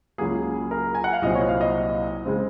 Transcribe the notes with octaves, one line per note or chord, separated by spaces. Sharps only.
C#2 C#3 F#3 A#3 G#4
A#4
G#5
F#5
F5
C2 A#2 F#3 C4 D#5
C#5
F5
D#5
C#3 G#3 C4